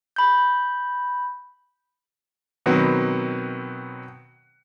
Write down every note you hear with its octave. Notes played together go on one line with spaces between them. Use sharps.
B5 G6
B2 D#3 F#3 B3 C4